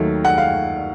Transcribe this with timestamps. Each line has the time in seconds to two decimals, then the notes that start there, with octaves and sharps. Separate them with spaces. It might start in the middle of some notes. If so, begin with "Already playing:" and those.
Already playing: D#2 D#3 F#3 A3
0.25 F#5
0.38 F5